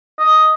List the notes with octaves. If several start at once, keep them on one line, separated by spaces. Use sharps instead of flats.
D#5